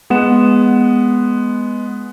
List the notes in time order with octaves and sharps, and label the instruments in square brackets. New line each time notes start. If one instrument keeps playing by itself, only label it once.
[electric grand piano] G#3 B3 F#5 E7